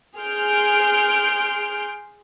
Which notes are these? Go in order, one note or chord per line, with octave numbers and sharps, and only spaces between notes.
G#4 C6 F6 G6 D7